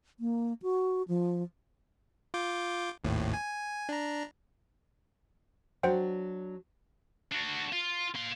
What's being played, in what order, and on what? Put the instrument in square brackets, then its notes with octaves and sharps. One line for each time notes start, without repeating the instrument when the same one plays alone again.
[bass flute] A#3
F#4
F3
[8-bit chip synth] F4 D6 G6
G#1 D#2 A2
G#5
D4 A#5
[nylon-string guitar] F#3 D4 [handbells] C5 F#5 G5
[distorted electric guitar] D4 F#4
F4
A#3 C6